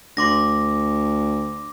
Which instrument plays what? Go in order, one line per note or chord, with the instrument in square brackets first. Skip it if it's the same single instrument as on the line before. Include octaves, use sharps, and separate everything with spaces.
[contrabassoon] D2 [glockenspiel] C6 D6 A#6